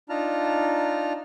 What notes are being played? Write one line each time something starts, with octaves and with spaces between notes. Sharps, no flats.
D4 D#4 F4 A5 A#5 F6